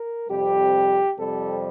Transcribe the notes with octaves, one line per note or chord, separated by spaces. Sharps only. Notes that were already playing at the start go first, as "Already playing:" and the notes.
Already playing: A#4
F2 C3 G3 G4
F2 C3 G3 C4 A4